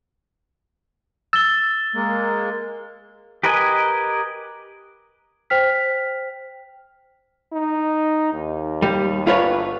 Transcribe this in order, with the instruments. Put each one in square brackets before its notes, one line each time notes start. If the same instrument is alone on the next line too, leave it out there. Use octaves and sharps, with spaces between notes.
[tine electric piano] E6 [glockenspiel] A6 G7
[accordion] G#3 A#3
[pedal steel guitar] G4 A#4 B4 D#5 G#5
[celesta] C5 G5 F6 B6
[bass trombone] D#4
D#2
[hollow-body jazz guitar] G3
[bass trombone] G1 [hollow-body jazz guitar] F4 B4 C#5